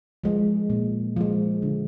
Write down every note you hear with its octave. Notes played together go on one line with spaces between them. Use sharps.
F3 G#3
A#2
F3 G#3
D3